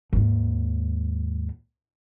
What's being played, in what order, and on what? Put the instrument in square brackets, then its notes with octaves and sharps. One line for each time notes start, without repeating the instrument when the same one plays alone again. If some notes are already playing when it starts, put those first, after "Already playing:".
[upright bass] D#2 G#2